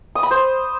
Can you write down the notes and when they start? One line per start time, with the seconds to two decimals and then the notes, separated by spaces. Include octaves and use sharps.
0.15 D#6
0.23 B5
0.31 C5